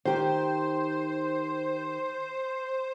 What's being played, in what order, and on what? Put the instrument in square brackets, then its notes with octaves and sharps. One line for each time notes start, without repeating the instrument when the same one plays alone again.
[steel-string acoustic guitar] D#3 G4 [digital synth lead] C5